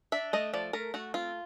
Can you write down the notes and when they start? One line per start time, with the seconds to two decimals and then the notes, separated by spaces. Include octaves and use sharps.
0.12 D4 E5
0.33 A3 D#5
0.54 F3 D5
0.73 A3 A#4
0.94 A3 F#4
1.14 C4 F4